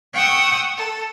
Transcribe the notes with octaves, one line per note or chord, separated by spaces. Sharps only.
F#5 G5 C#6 D#6 E6
A4